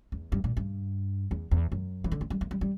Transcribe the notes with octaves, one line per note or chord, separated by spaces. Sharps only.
E2
G2
A#2
G2
E2
E2
F#2
E3
D3
A#3
G3
A#3
G3
G3